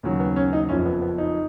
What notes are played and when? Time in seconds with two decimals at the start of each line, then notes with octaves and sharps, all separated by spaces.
0.03 D#2 C#3 F#3
0.20 B3
0.36 C#4
0.53 D#4
0.69 F#1 F2 F3 C#4
0.86 B3
1.02 B3
1.18 D#4